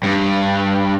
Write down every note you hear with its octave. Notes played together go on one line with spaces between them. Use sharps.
G2